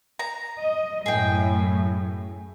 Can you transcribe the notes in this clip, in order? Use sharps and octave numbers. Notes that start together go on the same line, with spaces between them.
A#5
D#5
F#2 A2 G#4 G5